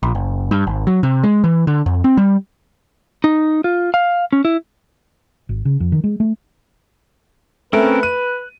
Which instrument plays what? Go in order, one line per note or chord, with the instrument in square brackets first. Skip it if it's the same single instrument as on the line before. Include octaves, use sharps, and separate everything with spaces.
[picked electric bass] A#1
F#1
G2
G#1
F#3
C3
G#3
E3
D3
F2
C4
G3
[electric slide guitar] D#4
F4
F5
C#4
E4
[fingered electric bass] G#1
C#3
F2
D#3
G#3
A3
[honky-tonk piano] A3 [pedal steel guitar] C4 C#4 A#4 [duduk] B4
[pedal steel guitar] F#6 [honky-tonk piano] D#7